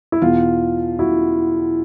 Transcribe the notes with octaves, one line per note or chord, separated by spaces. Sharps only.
E4
E2 B2 F4
E4 F#4